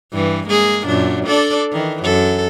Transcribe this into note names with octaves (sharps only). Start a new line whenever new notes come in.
G2 E3
G#3 A#3 G#4
F#2 A#2 D4
D4 A4 D5
D#3 E3
F#2 A4